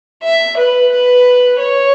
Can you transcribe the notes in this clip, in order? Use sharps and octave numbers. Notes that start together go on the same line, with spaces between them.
E5
B4
B4
C#5